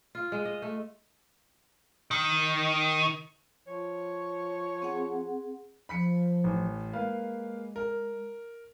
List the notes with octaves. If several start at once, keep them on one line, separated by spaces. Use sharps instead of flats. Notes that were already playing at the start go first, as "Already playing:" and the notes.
F4
G#3
D#5
A3
D#3
F3 C#5
C4 G#4 F#5
F3 B5 B6 C#7
A1
G#3 A#3 B4 F5
A#4